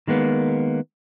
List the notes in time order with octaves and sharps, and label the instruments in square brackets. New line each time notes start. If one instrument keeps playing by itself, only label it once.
[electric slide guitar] D#3 G#3 A#3 B3